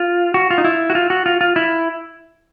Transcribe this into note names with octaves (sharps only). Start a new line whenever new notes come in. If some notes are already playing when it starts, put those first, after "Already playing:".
Already playing: F4
F#4
F4
D#4
E4
F#4
F4
F#4
F4
F4
E4